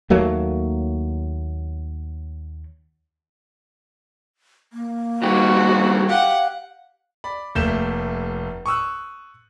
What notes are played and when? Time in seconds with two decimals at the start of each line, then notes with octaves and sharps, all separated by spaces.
0.10 D#2 F#3 A3 A#3
4.73 A#3
5.23 G2 D#3 F#4
6.08 G4 F5 F#5
7.24 D5 B5
7.55 F1 A3 A#3 G6 E7
8.66 C#6 D#6 E6 F#6